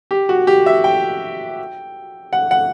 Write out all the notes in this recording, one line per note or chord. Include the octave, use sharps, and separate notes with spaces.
G4
F#4
G4
E5
G5
F#5
F#5